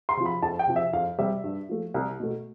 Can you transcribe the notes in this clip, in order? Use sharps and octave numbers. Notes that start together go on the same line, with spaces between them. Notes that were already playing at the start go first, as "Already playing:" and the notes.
C6
C3 F3
B5
F2 A5
G5
C3 F3
E5
F2 F5
C3 G3 E5
G2
F3 A3
C2
B2 A3